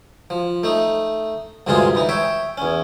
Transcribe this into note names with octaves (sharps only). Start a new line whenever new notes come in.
F3
A3 D#4
D2 G2 C3 G#3 F4 G#4
E3 D#4
C#5 E5 G5
E2 C#4